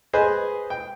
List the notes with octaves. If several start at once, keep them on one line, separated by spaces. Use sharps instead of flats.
G#4 B4 C5 D#5 G#5
G5